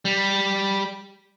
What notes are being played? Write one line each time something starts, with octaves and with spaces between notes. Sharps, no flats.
G3